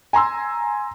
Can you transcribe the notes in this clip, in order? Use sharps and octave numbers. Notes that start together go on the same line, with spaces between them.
G#5 A#5 C6 E6